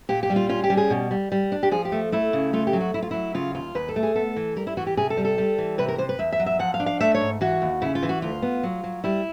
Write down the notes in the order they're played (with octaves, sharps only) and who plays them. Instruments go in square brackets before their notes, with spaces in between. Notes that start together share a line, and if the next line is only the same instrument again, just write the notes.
[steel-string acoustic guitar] A#2 G4
G4
G3
F4
C#4 F4
G4
G3
G#4
B2
G3
G3
D4
G4
F3 G#4
G4
A3
A3 E4
C#3
A3 F4
G4
F#3
F#4
F#3 E4
F4
F#3 E4
C#3 F4
D#2 F4
D#2 B4
A4
A3
G#4
B3 A4
E3
G3 A#4
E4
E3 F#4
G4
C3 G#4
A4
G3
A4
G3
E3
C3 B4
A#4
C3 C5
B4
E2 E5
E5
F#3
E5
F3 F#5
F5
D4
F5
A3 E5
C#5
G#2
E3 F#4
D#2
C#3 E4
F4
E3
F#4
D2 F4
B3
F#3
F#3
G3 E4